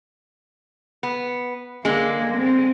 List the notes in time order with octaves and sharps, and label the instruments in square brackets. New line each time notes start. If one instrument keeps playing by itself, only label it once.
[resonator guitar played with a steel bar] B3
[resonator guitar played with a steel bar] D3 G#3 [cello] A#3
[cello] C4